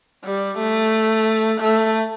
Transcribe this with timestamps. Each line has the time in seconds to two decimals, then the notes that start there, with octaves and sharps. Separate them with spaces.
0.24 G3
0.59 A3
1.61 A3